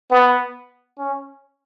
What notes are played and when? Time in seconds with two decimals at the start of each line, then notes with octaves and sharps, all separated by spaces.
0.11 B3
0.98 C#4